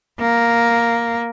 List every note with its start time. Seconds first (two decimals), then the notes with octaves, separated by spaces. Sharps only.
0.21 A#3